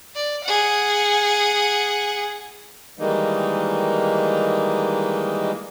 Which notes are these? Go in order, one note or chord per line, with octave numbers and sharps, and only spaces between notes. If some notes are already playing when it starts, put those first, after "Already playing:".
D5
G#4 F#5
D#3 E3 G3 G#3 A#3 D#4